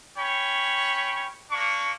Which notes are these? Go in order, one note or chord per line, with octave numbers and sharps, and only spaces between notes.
C#4 C#5 G5 B5
A#3 D4 C#6